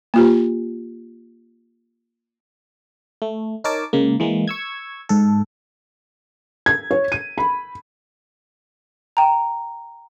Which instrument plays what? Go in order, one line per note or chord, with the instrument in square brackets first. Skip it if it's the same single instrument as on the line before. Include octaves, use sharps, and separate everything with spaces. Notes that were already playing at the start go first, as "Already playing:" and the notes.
[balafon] A#3 F4 G4
[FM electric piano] A3
D#4 A#4 C#5 A5 D6
C#3 G#3 A#3
E3 G#3 A#3
C#6 E6 G#6
G#2 A4
[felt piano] G#6
C#5
D#7
B5
[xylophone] G5 A#5